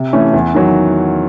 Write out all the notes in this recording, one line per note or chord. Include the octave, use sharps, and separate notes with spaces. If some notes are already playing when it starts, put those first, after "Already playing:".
Already playing: C3
E3 A3 C#4
E2
D#3 F#3